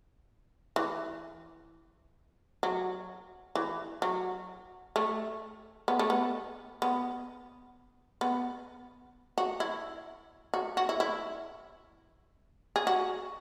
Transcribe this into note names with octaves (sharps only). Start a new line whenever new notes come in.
E3
F#3
E3
F#3
A3
B3
A3
B3
B3
B3
F#4
E4
F#4
F#4
E4
E4
G#4
F#4